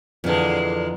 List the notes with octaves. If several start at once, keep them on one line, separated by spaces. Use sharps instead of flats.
F2 A#2 D3 E3 G#3